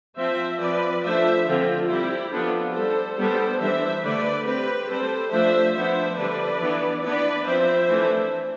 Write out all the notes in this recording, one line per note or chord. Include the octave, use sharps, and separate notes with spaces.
F3 C4 C5 E5
F3 C4 B4 D5
F3 A3 D4 C5 E5
D3 F3 C4 F4 A4
G3 C4 E4 G4
F3 B3 D4 F4 A4
G3 D4 A4 C5
G3 B3 D4 A4 C5
E3 G3 D4 C5 E5
D3 A3 D4 B4 D5
G3 C4 G4 B4
G3 C4 A4 C5
F3 A3 D4 C5 E5
F3 B3 D4 C5 E5
D3 G3 D4 B4 D5
E3 B3 D4
E3 B3 D4 B4 D5
F3 C4 C5 E5
E3 A3 D4